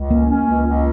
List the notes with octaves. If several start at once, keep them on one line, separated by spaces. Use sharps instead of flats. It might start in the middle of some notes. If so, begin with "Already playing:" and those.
Already playing: C#2
A#3 C#4
C#4
C#2
C#2